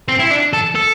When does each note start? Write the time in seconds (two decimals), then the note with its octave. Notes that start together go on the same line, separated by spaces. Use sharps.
0.08 C4
0.20 E4
0.31 D4
0.53 A4
0.75 A4